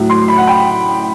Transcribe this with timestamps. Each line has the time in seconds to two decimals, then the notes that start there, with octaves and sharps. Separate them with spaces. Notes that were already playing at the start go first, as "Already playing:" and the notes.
Already playing: A2 F#3
0.09 C6
0.28 B5
0.37 F#5
0.47 G5